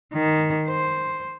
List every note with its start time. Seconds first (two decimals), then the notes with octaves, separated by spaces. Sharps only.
0.13 D#3
0.66 C5